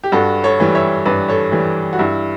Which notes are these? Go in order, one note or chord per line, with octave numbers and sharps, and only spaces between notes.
G4
G2 F#4 A4
A4 C#5
E3 G3
C#5 E5
G2 B4 D5
A4 C#5
E3 G3
F#4
G2 E4